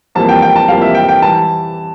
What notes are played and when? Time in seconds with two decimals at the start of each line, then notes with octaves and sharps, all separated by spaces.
0.15 F2 E3 G3 A#3 A5
0.29 G5
0.42 G5
0.56 A5
0.68 F2 E3 G3 A#3 F5
0.82 E5
0.95 G5
1.08 G5
1.22 E3 G3 A5